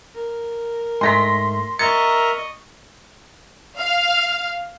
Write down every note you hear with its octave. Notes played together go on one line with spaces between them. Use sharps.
A#4
G#2 A3 C6 A#6 B6
A#4 D#5 E5 A#5 C#6 A6 C#7
F5